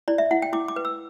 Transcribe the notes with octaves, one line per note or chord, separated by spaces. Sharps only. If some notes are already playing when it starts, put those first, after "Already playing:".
E4 D5
E5
E4 F#5
G5
E4 D6
D6
B4
E6